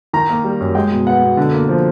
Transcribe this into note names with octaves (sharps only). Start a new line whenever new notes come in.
D#3 A#5
A#3
G3
F#2
G#3 G5
B2
B3 F#5
B2
D3
A#3
F3